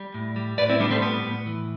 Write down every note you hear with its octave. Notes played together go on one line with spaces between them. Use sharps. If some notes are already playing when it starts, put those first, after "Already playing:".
Already playing: G3
A2
G3
A2 B4 D5
C4 E4
G3 B3 D4
A3 C4
A2 B3
A2
E3